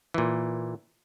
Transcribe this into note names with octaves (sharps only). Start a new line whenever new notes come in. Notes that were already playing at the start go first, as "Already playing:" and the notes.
A#2 E3